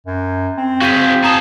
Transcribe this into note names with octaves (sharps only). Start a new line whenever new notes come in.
F#2
C4
F#4 G#4 F5 G6 B6
G#4 A5 A#5 D#6